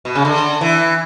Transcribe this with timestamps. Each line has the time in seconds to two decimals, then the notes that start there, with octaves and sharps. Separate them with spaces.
0.05 B2
0.15 C#3
0.25 D3
0.61 E3